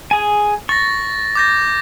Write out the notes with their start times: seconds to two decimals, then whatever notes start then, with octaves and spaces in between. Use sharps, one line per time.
0.11 G#4 G#5
0.69 C#6 A6 A#6
1.35 D6 G6 A#6